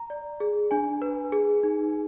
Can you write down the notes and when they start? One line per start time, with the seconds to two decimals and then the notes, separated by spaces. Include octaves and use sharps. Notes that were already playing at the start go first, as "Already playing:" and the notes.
Already playing: A#5
0.10 D5
0.40 G#4
0.71 D4 G#5
1.02 B4
1.32 G#4
1.63 D#4